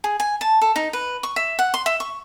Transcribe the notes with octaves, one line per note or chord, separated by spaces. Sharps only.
G#4
G#5
A5
A4
D#4
B4
C#6
E5
F#5
C6
E5
C#6